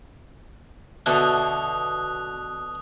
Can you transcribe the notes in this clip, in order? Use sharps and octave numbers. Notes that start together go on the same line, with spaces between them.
B2 D3 E5 D#6 F#6